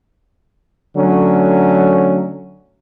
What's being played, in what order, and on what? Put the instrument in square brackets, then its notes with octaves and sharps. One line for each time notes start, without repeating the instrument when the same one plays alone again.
[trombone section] D3 F#3 A3 C#4